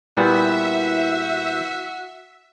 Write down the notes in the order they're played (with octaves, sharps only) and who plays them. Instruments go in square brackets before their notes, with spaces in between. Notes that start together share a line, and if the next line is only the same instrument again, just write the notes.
[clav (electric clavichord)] A#2 G3 B3 [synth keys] E4 B4 G6 [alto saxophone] F#4 [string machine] E5